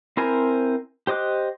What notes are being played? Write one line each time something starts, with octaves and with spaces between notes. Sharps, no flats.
C4 E4 A#4 C5 G#5
G4 C5 D#5 D6 F#6